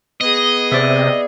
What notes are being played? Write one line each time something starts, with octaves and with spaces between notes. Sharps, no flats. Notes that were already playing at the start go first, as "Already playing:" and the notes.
B3 G#4 D#5
C3 D5 E5